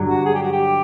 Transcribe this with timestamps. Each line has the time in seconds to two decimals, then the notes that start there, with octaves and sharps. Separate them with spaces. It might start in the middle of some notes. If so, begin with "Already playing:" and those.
Already playing: G2 D3 F#3
0.09 F#4
0.26 G#4
0.35 G4
0.43 F#4
0.53 G4